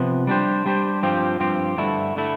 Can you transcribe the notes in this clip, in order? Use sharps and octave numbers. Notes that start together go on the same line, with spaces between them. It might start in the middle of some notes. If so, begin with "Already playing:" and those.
Already playing: C3 F3 B3
G3 D4 G4 C5
G3 D4 G4 C5
G2 F3 C4 G4
G2 F3 C4 G4
G2 D3 A3 E4
D3 A3 E4